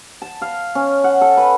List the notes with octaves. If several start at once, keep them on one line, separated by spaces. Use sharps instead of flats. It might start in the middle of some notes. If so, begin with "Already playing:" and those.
A5
F5
C#4
F#5
A4
B4